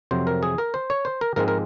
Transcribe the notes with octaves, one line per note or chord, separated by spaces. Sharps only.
F2 C3 F#3 C4 C5
A#4
G#4
A#4
C5
C#5
C5
A#4
G#2 F3 G#3 C4 A#4
A#4